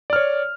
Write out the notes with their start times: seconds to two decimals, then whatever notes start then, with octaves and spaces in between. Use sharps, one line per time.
0.10 D5
0.13 F6
0.16 C#5